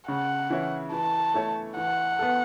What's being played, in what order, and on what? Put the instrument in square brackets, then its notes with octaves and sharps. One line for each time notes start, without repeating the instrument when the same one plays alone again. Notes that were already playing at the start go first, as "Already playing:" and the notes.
[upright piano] C#3 [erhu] F#5
[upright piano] E3 C#4 E4
[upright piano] E3 [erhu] A5
[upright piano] A3 E4 A4 C#5
[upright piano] E3 [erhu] F#5
[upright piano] B3 A4